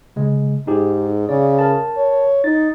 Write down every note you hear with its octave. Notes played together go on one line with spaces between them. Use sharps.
C#3 G#3
G#2 D#4 G4 G#4
C#3 D5
A#4 A5
C#5
D#4 A6